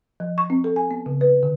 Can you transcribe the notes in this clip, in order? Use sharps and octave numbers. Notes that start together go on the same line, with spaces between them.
F3
C#6
C4
A4
G#5
B3
C#3
B4
D3